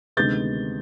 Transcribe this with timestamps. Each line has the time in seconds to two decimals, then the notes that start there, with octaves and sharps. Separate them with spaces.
0.17 D2 C3 D#3 G#3 B3 G6 A6